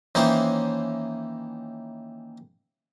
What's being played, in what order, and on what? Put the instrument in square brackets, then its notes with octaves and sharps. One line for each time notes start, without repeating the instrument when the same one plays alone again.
[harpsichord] D#3 E3 A#3 C#4 D#4 C5